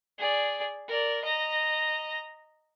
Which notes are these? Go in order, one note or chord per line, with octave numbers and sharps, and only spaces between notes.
G#4 D5
A#4 D5
D#5 A#5